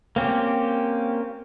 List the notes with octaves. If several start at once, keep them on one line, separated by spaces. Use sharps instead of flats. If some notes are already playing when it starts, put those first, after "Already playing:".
A#3 C4 C#4 G4